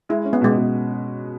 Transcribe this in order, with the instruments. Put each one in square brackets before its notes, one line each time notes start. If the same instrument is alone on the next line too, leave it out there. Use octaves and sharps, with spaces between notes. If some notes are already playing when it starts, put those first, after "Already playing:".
[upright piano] G#3 [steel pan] E4
[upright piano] C#4
[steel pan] B3
[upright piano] B2 [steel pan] G#3
[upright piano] B2